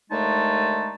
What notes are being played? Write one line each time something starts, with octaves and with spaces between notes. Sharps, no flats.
D#2 D3 G#3 A3 D#4 A5